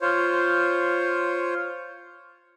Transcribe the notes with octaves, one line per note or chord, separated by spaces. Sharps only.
F4 C5 C#5